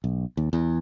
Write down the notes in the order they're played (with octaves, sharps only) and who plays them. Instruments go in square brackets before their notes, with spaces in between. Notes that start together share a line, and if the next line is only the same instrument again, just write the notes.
[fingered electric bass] B1
D#2
E2